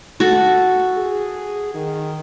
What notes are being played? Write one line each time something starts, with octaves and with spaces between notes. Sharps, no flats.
F#4 A4
G#4
D#3